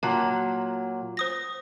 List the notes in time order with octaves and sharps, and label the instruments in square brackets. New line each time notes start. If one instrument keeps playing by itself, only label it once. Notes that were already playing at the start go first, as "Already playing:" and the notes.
[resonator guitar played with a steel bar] A#2 F#3 [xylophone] A5
[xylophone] C5 D#6 A#6